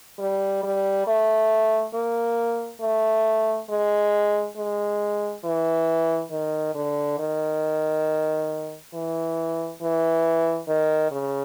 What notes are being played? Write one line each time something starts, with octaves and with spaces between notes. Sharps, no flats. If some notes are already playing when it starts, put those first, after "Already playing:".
G3
G3
A3
A#3
A3
G#3
G#3
E3
D#3
D3
D#3
E3
E3
D#3
C#3